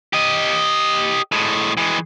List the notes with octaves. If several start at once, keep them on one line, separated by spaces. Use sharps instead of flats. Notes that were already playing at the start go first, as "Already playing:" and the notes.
G4 D#5
A2 G#3
E3 G#3